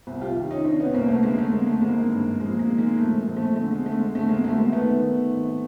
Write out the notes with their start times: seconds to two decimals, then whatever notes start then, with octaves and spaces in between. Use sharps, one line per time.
0.07 C2
0.21 F4 G4
0.36 D#3
0.51 C#4 D#4
0.64 C3 C4 D4
0.80 B3 C#4
0.94 C2 A#3 C4
1.08 A3 B3
1.23 D3 G#3 A#3
1.38 A3
1.52 D3 G#3 A#3
1.67 A3
1.81 G#1 G#3 A#3
2.10 G2
2.40 A#1 G#3 A#3
2.59 G#3 A#3
2.69 D#3
2.78 G#3 A#3
2.97 A#1 A3
3.17 G#3
3.27 A#1
3.37 A3
3.56 D3 A3
3.71 G#3
3.86 D3 A3
4.00 G#3
4.15 D3 A3
4.29 G#3 A#3
4.44 D2 A3
4.58 G#3 A#3
4.72 D#3 A3 B3
5.02 D#3
5.31 G#1